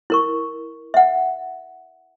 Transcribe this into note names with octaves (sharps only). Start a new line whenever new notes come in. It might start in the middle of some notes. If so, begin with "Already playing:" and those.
E4 A#4 C#6
E5 F#5